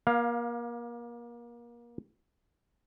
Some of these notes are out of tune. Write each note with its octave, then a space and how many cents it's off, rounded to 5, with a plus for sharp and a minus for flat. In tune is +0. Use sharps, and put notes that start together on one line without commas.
A#3 +30 F5 +10